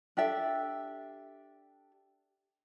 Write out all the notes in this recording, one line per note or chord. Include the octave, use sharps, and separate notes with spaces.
D4 G4 A4 E5